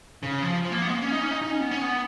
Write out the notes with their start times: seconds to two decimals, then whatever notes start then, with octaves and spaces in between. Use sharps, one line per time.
0.23 C#3
0.42 F3
0.62 F3
0.72 A#3
0.82 B3
0.88 G#3
0.91 A#3
1.02 C#4
1.12 D#4
1.21 C#4
1.31 D#4
1.42 D#4
1.51 C#4
1.60 B3
1.71 C#4
1.81 B3